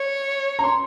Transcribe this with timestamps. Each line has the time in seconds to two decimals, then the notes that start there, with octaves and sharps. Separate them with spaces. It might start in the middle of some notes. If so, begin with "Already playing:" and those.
Already playing: C#5
0.59 A#5
0.63 C6